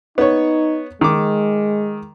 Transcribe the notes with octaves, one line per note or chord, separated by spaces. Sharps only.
B3 D#4 C#5
D#3 G#3 D6